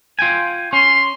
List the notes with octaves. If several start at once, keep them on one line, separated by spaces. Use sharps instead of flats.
F4 G5 G#5
C#4 C6